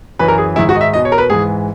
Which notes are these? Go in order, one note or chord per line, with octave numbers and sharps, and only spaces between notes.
F#2 E3 B4
A#4
G#4
G#2 D#3 E4
F#4
D#5
E5
E2 B2 D#5
C#5
A#4
B4
G#2 E3 G#4